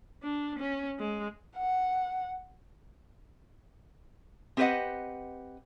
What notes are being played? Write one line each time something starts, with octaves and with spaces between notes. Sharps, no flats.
D4
C#4
G#3
F#5
C4 G4 B4 C#5 D#5 F#5